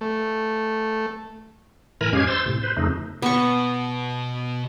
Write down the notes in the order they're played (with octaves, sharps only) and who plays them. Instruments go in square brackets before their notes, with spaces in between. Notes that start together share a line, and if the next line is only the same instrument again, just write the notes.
[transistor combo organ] A3
[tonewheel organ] A2 E3 A#4 G#5 A#5 B5
F#2 G#3 C#4 G4 F5 G#6
C5 C6 E6 A6
A2 C3
B4 C5
F2 C#3 A3 D#4
[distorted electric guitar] B2 [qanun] B3 C#6